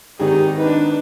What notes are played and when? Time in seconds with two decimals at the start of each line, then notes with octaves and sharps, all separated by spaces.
0.20 G#1 D#3 D#4 G4 G#4
0.58 D4 D#4 B4